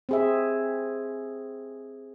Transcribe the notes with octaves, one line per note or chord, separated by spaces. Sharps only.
C4 G#4 E5